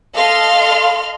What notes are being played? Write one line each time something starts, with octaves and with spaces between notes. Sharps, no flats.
A4 D#5 F5 C6 F6